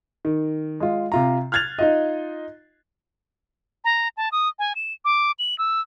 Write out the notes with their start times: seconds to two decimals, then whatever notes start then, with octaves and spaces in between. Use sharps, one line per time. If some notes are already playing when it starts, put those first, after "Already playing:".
0.25 D#3
0.80 G#3 F4
1.12 C3 F4 A#5
1.52 F6 F#6 G#6 A6 F7
1.79 D#4 F4 D#5
3.84 A#5
4.17 A5
4.32 D#6
4.59 G#5
4.76 E7
5.05 D6
5.39 F#7
5.58 E6